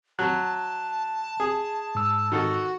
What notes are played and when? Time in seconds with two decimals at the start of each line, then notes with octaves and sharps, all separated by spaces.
0.19 F#3 A5 F#6
1.40 G#4
1.95 G#2 E6
2.32 D#3 F#4 A4